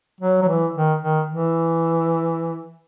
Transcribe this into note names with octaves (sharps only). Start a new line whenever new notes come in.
F#3
F#3
E3
D#3
D#3
E3